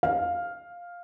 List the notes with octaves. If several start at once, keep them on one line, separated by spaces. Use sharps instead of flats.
F5